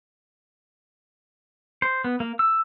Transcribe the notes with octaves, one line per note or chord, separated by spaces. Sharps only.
C5
B3
A#3
E6